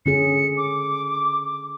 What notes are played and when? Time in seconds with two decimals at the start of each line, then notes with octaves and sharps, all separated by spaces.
0.06 D3 C#4 G#4 C#7
0.57 D6